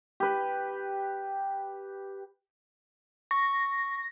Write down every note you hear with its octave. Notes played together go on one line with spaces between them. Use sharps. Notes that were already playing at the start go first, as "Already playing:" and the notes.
G4 B4
C#6 A#6